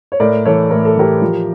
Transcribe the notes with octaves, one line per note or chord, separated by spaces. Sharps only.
C#5
A2 A#4 D5
E3 A4 C#5
A2 A#4
A4
E3 G4 A#4
F3